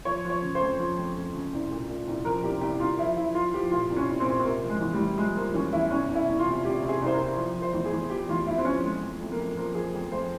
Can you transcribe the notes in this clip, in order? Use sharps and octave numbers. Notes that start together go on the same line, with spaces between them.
F3 C#5
F3 C#5
C#3
C5
F2
F3
F2
F2
C#3
C2
A#2
A#2
C2
F3 A#4
C2 G4
C2 G4
C2 F4
F3 E4
F3 E4
F3 F4
F3 G4
A#2 F4
C2
C#4
C2
C4
A#2
C4
C3 A#3
F3
G#3
E2
G3
E2
F3 G#3
F3 A#3
E2 C#4
E2 E4
C2 C#4
C2
E4
C2
F4
C3
C3 G4
C3
G#4
C2
C5
A#4
C2
F3
F3
C5
E2
G#4
E2
F3 G4
E2 F4
E2 E4
C4
F3 C#4
F2 G#3
F2
F2
A#3
F2
F3 A#3
F3 G#4
F2
F2 C5